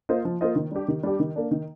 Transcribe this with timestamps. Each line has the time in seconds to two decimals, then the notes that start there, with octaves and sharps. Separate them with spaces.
0.09 A#3 F4 C5 D#5
0.25 F3
0.41 A#3 F4 C5 D#5
0.56 D#3
0.71 G3 D4 G4
0.88 D#3
1.03 G3 D4 G4
1.20 D#3
1.36 A#3 D4
1.51 D#3